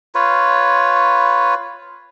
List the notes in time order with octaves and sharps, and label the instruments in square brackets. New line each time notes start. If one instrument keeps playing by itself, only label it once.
[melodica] F4 B4 C#5